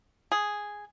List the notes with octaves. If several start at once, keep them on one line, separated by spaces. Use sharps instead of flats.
G#4